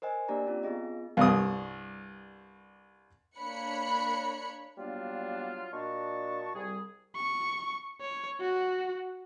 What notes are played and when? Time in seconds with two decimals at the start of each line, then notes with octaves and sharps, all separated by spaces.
0.02 A#4 C5 D#5 G#5
0.28 A#3 D4 G4 D5 A#5
0.46 C4 C#4 F4
0.63 B3 F4 G#4 D#5
1.17 C2 G2 D#6
3.36 A#3 D4 C#5 B5 F#6 C#7
4.78 F#3 G3 A#3 B3 D4 F4
5.73 A#2 D4 F#4 D#5 A5 C#6
6.55 C2 G3 G#4
7.16 C#6
8.01 C#5
8.41 F#4